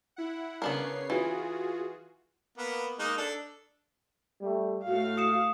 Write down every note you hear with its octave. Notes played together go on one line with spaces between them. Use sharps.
E4 F#5
C#3 B3 D4 A#4 C#5 C7
E3 F4 F#4 G#4
A#3 B3
G#3 A#3 D#4
D4 A4
G3 A3
A2 A3 F#4 F5
D#6 C#7 E7